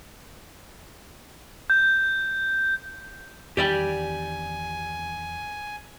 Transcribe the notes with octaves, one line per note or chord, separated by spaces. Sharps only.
G6
E2 D#3 D4 G4 D5 G5 G#5